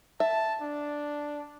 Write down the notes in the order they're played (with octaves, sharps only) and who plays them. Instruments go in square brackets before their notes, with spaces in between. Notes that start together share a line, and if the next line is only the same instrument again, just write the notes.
[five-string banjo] E5 [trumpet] A5
[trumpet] D4